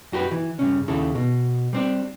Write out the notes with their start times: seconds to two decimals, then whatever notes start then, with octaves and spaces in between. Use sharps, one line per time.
0.12 F#2 F#4 G4 A#4 B4
0.31 E3
0.59 G2 C#3 C#4
0.88 D#2 C#3 E4 A4
1.15 B2
1.73 G3 C4 D4